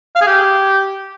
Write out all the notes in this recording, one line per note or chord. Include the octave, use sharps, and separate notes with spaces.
F5
G#4
G4